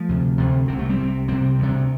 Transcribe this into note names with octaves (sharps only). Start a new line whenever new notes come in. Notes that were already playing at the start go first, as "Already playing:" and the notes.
Already playing: F3 A3
D2 C3
D2 C3
C2 C3 C4
A3
G3 C4
C2 C3
C2 C3 G3 C4
D2 C3